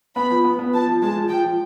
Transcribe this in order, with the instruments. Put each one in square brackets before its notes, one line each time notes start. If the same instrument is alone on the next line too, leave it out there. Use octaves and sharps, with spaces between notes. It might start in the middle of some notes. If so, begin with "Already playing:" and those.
[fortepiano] B3 [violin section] B5
[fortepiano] F3
B3
B3
[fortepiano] F3 [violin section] A5
[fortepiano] F3
[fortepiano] G#3 [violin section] A5
[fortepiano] F3
[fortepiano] F3 [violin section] G5
[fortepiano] F3